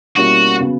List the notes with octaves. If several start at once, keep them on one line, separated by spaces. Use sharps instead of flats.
B2 G3 A#3 C#4 E4 F#4
C#3 F#3 B3